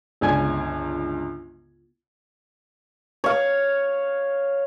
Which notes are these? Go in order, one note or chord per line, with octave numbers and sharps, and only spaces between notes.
G1 C#2 D4 G#5 G#6
C#5 F5